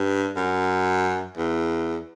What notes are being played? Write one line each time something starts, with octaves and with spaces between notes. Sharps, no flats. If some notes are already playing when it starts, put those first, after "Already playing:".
Already playing: G2
F#2
E2